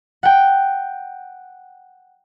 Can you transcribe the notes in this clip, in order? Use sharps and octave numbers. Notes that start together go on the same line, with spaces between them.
F#5 G5